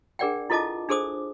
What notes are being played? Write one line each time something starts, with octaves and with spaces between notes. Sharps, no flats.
D4 G#4 A#4 D5 F#5 G5
E4 F4 A4 D#5 A5 D6
D4 G#4 A4 C5 D6 D#6